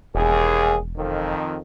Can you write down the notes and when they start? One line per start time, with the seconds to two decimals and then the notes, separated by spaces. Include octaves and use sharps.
0.15 E1 D#2 G#4
0.97 F2 D#3